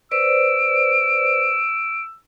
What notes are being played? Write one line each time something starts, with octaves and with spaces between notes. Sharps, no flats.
B4 C5 D5 E6 D7